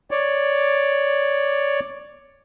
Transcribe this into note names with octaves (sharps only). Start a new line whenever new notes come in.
C#5 D5